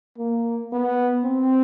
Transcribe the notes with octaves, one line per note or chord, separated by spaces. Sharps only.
A#3
B3
C4